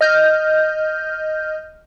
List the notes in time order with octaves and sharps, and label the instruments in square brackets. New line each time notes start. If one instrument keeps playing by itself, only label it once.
[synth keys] D#5 F6 G6